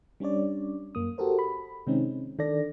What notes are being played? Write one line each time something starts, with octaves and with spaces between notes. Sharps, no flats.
G3 C#4 D4 C#5 D5
F#2 A#3 D#6
F#4 G4 A4 A#4 C5
B5
C3 D#3 G#3 C4 C#4 D#4
D#3 D4 A4 D5 A#6